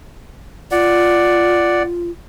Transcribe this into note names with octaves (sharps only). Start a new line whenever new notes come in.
F4 D5 F#5